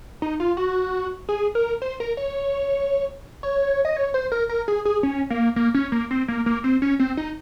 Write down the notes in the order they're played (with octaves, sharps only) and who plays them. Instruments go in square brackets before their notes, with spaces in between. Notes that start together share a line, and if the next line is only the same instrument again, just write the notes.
[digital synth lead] D#4
F4
F#4
G#4
A#4
C5
A#4
C#5
C#5
D#5
C#5
C5
A#4
A#4
G#4
G#4
C#4
A#3
A#3
C#4
A#3
C4
A#3
A#3
C4
C#4
C4
D#4